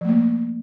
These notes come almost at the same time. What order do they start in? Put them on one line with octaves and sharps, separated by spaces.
F3 A3 A#3